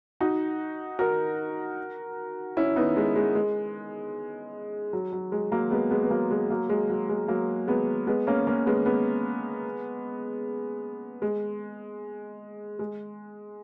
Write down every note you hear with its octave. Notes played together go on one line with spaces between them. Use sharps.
D#4 F#4
F#4 A#4
C#4 E4
B3 D#4
G#3
G#3
G#3
F#3
F#3
G#3
F#3 A#3
G#3 B3
G#3 B3
B3
F#3 A#3
G#3
F#3 A#3
G#3
F#3
G#3
F#3 A#3
G#3 B3
G#3 B3
A#3 C#4
A#3 C#4
G#3 B3
G#3 B3
G#3
G#3